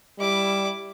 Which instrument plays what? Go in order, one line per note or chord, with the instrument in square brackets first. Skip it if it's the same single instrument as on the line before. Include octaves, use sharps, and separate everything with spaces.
[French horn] G3 [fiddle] E4 D6